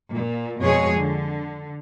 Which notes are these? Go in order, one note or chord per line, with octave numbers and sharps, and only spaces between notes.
A#2
F2 B2 G#3 G#4 C#5
D3